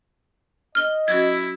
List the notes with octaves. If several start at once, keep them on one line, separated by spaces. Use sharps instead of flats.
D#5 F6 G7
F#3 C#4 E4 F#4 G#6